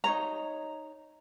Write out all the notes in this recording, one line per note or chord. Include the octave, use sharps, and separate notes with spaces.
D#4 G#4 C#5 A#5